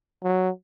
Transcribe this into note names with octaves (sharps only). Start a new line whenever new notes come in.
F#3